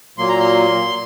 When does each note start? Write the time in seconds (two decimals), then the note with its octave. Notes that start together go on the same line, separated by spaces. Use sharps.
0.18 A#2 F#3 A#3 C6
0.29 A#5
0.40 C6